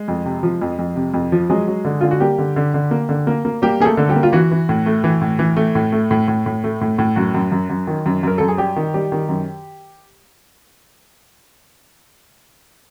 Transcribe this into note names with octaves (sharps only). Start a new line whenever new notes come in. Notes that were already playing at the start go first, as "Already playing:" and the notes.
Already playing: G#3
F2
C3
F3
F2
F2
C3
F2
F3
F#3 G#3 G#4
F#3
D3
D3 F4
F#4
G3 A#3 G4
D3
D3
D3
A#3
D3
A#3
A#3
G3 A#3 G4
A3 A#3 G#4 A4
D3
G3 G4
A#3
F4
E3 F#4
E3
A2
A3
E3
A2
E3
A3
A2
A3
A2
A2
A2
A3
A2
A2
F#2 F#4
F#2
F#2
F#2
D#3
F#2
F#2 A#4
F#2 A4
G#4
G3 G4
D#3
G3
D#3
F#2